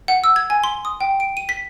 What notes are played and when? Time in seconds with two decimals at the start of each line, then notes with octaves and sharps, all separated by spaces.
0.08 F#5
0.24 E6
0.36 G#6
0.50 G#5
0.64 C6
0.85 D#6
1.01 G5
1.20 D7
1.37 D#7
1.49 B6